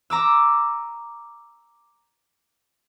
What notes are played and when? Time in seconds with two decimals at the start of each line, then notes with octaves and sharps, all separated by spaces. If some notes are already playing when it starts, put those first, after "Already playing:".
0.10 A#5 D6 E6